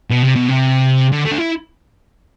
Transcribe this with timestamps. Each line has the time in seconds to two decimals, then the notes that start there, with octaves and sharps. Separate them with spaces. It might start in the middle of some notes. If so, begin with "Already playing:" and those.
0.10 B2
0.23 C3
0.36 B2
0.49 C3
1.12 D3
1.25 A3
1.32 D4
1.38 E4